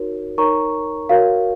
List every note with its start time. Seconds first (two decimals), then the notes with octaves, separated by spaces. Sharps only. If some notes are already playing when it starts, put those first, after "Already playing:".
Already playing: D#4 F#4 A#4 C#5
0.38 D#4 A#4 C#5 A#5 C#6
1.09 F#4 A#4 C#5 F5